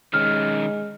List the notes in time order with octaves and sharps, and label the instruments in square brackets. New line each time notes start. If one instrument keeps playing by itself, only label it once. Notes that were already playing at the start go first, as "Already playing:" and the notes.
[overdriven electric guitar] D#3 C#4 [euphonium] G#3 [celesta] F6